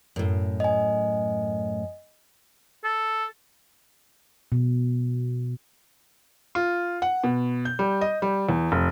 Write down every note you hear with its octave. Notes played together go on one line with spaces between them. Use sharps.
F#2 A2
D#5 G#5
A4
B2
F4
F#5
B2
G6
G3
D#5
G3
E2
F1